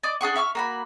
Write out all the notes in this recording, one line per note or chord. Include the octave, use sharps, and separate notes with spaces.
D5 D#5 D6
D4 G#4 F#5 C#6
E5 C#6 E6 F6
A#3 F#4 B5